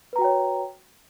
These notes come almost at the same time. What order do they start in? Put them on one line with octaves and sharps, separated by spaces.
B4 A#5 F#4 G5 C#5